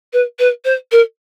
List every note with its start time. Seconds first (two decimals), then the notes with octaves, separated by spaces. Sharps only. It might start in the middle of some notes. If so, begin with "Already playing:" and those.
0.13 B4
0.39 B4
0.65 C5
0.92 A#4